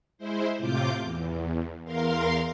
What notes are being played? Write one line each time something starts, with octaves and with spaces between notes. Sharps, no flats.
G#3 E4 C5
A2 C3 F4 D6 G6
E2
E2 A#4 F5 C6